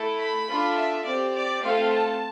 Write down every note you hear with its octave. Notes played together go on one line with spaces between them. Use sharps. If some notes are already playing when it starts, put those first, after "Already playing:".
Already playing: A3 E4 A4
B5
D4 F4 A4
E5
C4 G4 D5
D5
A3 C4 F4 A4 F5
A5